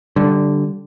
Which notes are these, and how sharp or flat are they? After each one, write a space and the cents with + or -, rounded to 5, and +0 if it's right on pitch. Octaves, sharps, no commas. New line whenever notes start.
D3 +0 G3 -15